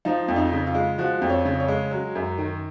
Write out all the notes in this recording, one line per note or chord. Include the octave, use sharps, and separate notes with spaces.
F3 D#4
F2
D#4
C#3
F4
G#3
F3 F#4
F2
C#5
C#3
C#5
G#3
F#3
F#2
D#3